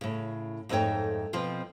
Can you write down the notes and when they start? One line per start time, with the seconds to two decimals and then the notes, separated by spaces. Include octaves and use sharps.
0.01 A2 C#3
0.69 F2 G#2 A3 D#4 C#5 G5
1.33 B2 F3 C4 F4